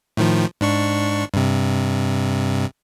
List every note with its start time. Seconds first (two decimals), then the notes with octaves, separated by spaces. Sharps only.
0.17 A2 D#3 F3
0.61 G#2 D4 C#6
1.34 G2 C3